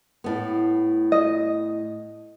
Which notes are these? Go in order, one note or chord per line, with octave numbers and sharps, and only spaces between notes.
A2 B3
D#5